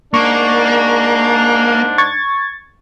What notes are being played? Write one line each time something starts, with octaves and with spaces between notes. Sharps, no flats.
G#2 A#3 D4 C#6
C#6 G#6 A6